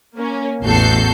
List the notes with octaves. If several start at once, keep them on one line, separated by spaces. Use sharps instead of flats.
A#3 C#4
A1 E2 F#4 A4 G6 C7